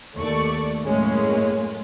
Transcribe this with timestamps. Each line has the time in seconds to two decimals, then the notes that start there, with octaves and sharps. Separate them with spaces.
0.16 D#2 A3 D5 C#6
0.85 F#2 A2 G#3 A#3 C#4